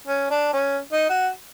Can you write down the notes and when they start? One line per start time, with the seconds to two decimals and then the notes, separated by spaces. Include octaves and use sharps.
0.07 C#4
0.31 D4
0.53 C#4
0.92 D#4
1.10 F#4